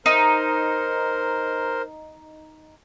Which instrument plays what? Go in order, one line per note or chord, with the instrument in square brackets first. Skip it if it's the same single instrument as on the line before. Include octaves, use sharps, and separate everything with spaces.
[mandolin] D#4 [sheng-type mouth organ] A#4 C5